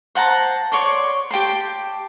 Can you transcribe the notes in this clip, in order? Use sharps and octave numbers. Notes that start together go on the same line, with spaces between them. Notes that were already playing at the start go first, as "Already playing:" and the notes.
C5 F#5 A5 A#5
C#5 D5 C6 C#6
G4 G5 A5 C6